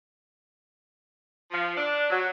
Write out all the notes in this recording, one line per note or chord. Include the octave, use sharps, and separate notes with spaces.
F3
D4
F#3